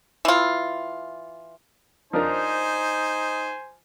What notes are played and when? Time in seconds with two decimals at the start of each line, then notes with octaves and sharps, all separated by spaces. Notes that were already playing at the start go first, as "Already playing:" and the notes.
0.25 E3 F4
2.13 F3 D4 D#4 A#4 C5 G#5